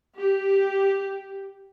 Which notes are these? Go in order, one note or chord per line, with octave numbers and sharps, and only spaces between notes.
G4